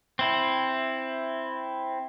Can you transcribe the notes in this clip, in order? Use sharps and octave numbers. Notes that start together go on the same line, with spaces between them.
C4 E4